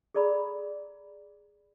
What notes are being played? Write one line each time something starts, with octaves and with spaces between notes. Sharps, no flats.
G#4 A4 D5 A#5 B5